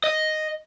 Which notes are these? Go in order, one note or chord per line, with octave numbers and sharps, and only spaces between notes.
D#5